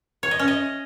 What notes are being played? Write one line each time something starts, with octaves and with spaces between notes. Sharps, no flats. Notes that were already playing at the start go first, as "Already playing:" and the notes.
C#5
D#5
C#4
D#5